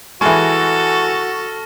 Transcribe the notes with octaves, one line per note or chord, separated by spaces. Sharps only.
E3 G#3 F#4 A4 C#6 F6 A#6